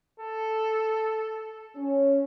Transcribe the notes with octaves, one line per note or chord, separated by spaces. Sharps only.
A4
C#4